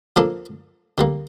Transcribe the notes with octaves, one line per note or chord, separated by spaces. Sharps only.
F3 A#3 D4 A4 D5
D3 G3 A#3